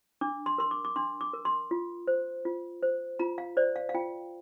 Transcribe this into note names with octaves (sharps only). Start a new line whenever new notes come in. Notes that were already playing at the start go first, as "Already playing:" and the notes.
D4 D6
C6
A#4 C6
D6
D6
D4 C6
D6
A#4
C6
F4
C5
F4
C5
F4 A#5
F5
C5 D5
F5
F5
F4 G5